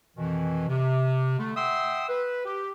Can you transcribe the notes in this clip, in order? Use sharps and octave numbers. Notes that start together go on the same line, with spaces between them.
F2 B2 D#3 E3
C3
D3 A3
E5 F#5 G5 C6 D#6 E6
B4
G4